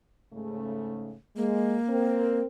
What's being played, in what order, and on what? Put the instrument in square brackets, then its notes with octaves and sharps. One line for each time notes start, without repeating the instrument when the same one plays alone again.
[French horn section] G#2 C#3 A3
[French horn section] G#3 [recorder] A#3
[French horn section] C4 A#4